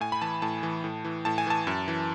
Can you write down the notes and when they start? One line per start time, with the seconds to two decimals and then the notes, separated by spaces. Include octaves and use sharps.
0.01 A2 G#5
0.12 B5
0.22 E3 A5
0.42 A2 A5
0.63 E3
0.84 A2
1.04 E3
1.25 A2 A5
1.38 G#5
1.47 E3 A5
1.67 F#2
1.88 E3